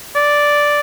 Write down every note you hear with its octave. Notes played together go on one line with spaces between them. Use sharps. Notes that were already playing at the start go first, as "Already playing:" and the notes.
D5